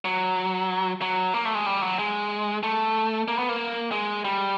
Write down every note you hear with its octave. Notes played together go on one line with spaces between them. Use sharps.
F#3
F#3
A#3
A3
G#3
G3
F#3
G#3
A3
A#3
B3
A#3
G#3
G3